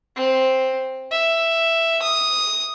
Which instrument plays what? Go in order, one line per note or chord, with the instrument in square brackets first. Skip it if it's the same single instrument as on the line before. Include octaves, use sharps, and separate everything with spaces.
[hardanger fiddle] C4
E5
D#6